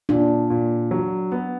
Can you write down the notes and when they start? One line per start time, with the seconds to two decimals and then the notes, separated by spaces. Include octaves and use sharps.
0.09 A#2 D4
0.50 A#2
0.91 F#3
1.32 B3